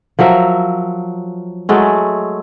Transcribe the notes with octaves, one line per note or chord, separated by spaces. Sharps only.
F3 F#3 A#4 E5
F#3 G#3 A3